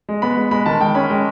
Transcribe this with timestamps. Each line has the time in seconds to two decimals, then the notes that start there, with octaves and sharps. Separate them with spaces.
0.09 G#3
0.22 B3 B5
0.37 G#3
0.51 G#3 B5
0.66 D#3 A5
0.80 G#3 G5
0.95 C#4 B5
1.10 G#3